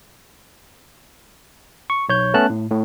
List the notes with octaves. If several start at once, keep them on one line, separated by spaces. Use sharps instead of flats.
C#6
B1 C#5 G6
A3 B3 C#4 A5 F#6
A2
A2